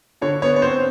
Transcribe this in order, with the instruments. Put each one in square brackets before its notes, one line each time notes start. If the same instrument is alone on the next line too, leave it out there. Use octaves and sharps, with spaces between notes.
[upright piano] D3 [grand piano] C#5
[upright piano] B3 [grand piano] C#5
[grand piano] C#5
[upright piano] C4 [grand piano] C5